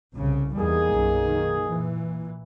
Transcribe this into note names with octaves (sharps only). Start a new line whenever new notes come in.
C2 C#3
E2 G3 A#3 D#4 G#4
B1 F#2
D#3
A#2 E3